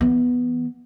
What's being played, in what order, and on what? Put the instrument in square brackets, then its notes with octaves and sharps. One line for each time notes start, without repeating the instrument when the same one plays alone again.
[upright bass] E3 B3